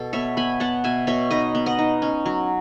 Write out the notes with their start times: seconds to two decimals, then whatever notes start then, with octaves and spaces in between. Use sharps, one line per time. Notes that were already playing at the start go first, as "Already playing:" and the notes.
Already playing: B2 A4
0.13 B3 C#5 E5
0.37 B3 G#5 B5
0.60 B3 F#5 A5
0.84 B2 E5 G#5
1.07 B2 C#5 E5
1.31 D#4 B4 D#5
1.55 B3
1.66 D#5 F#5
1.79 D#4
2.02 C#4
2.26 F#3